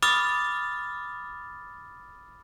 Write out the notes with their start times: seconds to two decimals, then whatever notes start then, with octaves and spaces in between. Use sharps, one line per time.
0.02 B5 D6 D#6 F6 A6